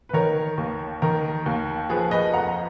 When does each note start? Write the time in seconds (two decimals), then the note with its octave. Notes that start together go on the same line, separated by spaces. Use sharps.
0.09 B4
0.13 D#3 A#4 C#5
0.58 D#2
1.02 D#3 A#4
1.46 D#2
1.89 F3 G#4 B4
2.11 B4 D#5
2.33 F2 F#5 A#5
2.48 A#5